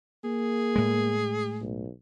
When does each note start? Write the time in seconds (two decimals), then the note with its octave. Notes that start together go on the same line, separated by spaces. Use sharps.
0.24 A#3 G#4
0.76 A2 G#3
1.61 B1